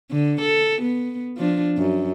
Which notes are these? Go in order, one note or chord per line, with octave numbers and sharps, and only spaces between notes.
D3
A4
B3
F3 D4
F#2